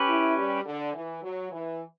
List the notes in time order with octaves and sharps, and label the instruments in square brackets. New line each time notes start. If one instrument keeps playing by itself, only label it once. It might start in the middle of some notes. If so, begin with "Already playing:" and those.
Already playing: [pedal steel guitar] C#4 G4 B4
[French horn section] E4
G3
D3
E3
F#3
E3